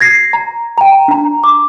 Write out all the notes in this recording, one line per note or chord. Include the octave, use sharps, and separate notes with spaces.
G#6 A#6 C7
A#5
G5 A#5
D4 A#5
D6